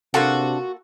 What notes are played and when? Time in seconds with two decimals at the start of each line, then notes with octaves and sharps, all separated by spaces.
0.14 C3 A#3 D4 F4 F#4 A4 F#5